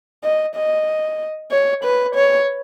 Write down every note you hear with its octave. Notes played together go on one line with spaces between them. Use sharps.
D#5
D#5
C#5
B4
C#5